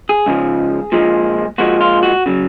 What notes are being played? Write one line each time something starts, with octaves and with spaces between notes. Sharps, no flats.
G#4
C#2 C#3 F3
A#2 F3 G#3
A#2 F3 G#3 F#4
F4
F#4
C#3 F#3